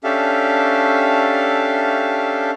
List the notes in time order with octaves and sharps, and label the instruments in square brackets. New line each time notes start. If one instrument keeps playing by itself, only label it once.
[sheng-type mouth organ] C#4 D4 G4 A4 E5 F5